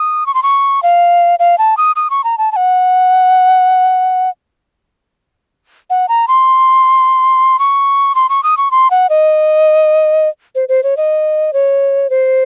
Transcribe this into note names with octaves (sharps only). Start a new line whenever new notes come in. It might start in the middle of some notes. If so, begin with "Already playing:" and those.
Already playing: D#6
C#6
C6
C#6
F5
F5
A5
D#6
D#6
C#6
A#5
A5
A5
F#5
F#5
A#5
C6
C#6
C6
C#6
D#6
C#6
C6
F#5
D#5
C5
C5
C#5
D#5
C#5
C5